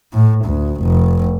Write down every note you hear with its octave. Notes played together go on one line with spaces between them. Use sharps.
A2
D2
F1